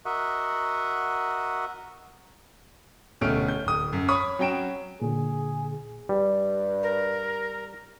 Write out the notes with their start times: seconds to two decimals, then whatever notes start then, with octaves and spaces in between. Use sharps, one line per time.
0.05 F#4 A#4 D#5 E5 F#5
3.21 D1 B2 A3 C#4 F6 D7
3.48 G6
3.66 D1 D#6
3.93 F#2
4.08 C#5 B5 C#6 D#6
4.39 F#3 C#4 G5 D7 E7
5.02 A#2 D3 G#4
6.09 G2 G3
6.82 A#4